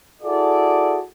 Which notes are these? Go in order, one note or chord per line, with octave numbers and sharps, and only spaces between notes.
E4 F#4 G#4 A4 D5